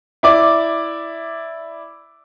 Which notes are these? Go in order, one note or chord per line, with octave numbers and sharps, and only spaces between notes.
E4 D5 D6